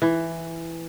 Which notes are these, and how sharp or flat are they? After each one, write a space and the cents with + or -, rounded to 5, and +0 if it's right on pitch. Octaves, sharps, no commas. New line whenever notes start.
E3 +5